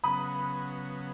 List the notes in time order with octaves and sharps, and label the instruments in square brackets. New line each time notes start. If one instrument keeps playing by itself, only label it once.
[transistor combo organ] C#3 F#3 B3 [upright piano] B5 D#6